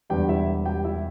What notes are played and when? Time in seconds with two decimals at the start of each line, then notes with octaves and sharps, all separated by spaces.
0.10 E1 E2 D3 G3 G4 G5
0.29 E4 E5
0.66 G4 G5
0.85 E4 E5